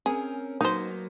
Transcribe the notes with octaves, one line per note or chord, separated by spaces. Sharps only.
C4 C#4 G#4 A#4
F#3 A#3 B3 D#4 C5